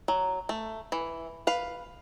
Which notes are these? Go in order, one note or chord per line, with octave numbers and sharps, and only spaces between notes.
F#3
A3
E3
B4 F5